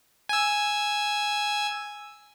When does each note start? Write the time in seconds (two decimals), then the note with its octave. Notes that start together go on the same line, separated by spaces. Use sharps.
0.29 G#5 E6